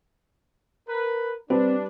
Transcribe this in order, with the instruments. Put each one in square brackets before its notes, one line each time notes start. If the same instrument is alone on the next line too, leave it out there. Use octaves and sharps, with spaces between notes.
[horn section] A#4 B4
[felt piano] G3 B4 [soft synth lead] C4 [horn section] D4